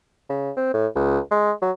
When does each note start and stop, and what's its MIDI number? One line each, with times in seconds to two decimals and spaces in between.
0.30 0.51 49
0.57 0.72 60
0.74 0.87 45
0.96 1.19 37
1.31 1.52 56
1.62 1.71 54